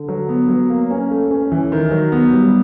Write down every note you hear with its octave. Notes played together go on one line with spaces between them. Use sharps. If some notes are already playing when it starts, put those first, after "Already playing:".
Already playing: D3
F#3
B3
F#3
A#3
C#4
A3
C#4
E3
D#3
F#3
B3
G3